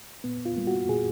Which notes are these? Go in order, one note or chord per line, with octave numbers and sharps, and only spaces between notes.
A#2 B3
F4
G3 A#3
F#4
A#2 G#4